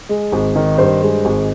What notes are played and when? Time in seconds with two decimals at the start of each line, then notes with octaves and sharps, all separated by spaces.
0.09 G#3
0.32 G#1
0.56 D#3
0.78 G2 C5
1.02 G#3
1.25 G#1